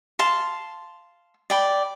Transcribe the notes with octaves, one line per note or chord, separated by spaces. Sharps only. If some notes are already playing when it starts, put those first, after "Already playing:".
F5 A5 C6
D5 G5 B5